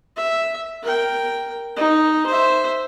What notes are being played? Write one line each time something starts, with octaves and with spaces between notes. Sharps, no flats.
E5
A#4 G5
D#4
C5 E5